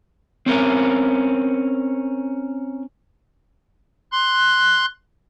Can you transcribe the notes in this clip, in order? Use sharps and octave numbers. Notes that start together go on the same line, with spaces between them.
C4 C#4 A#4
C6 F#6